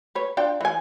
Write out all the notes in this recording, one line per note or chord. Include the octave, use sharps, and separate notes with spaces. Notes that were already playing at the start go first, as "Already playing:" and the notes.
B4 C#5
D4 F4 G5
E3 G#5